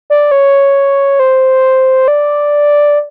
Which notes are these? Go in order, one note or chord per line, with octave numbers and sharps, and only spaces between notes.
D5
C#5
C5
D5